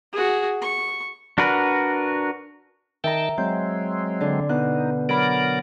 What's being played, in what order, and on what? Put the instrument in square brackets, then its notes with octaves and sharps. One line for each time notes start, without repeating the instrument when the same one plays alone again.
[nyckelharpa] F#4 G#4
C#6
[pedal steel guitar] D4 F#4 A#4 B4
[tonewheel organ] D#3 G5 A5 [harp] E5 A#5
[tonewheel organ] F#3 G#3 C4 [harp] G6
[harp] D3
[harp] B2 F#6 [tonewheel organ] D#4
[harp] F#3 B5 [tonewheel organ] A#4 D5